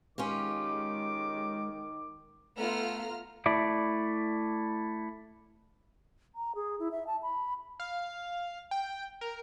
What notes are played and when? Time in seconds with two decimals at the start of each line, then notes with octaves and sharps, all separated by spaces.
0.18 D#3 G#3 C#4 F4 G4 D6
2.57 A3 B3 F4 A#5 F6
3.46 A3 E4 D5
6.35 A#5
6.55 G#4
6.79 E4
6.92 E5
7.07 A5
7.23 B5
7.80 F5
8.71 G5
9.21 A#4